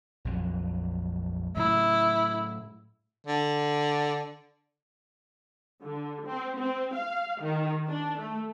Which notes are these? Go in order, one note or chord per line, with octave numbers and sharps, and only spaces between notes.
A#1 F2 F#3
A2 C#3 F#3 E4
D3
D3
C4
C4
F5
D#3
D4
A3